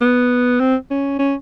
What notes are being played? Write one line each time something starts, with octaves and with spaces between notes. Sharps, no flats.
B3
C4
C#4
C#4